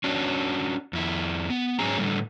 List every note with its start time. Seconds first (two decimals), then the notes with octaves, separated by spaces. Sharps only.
0.04 C#4 D4 F#4
0.93 F2 E4
1.50 B3
1.79 G#2 F#3 C#4 G#4 A#5
1.97 A2 D3 G3 A3